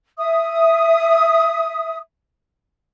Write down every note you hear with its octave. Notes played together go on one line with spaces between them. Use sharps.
E5 D#6